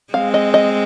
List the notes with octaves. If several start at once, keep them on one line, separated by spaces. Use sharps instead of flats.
G#3 C4 F5
D#5
D#5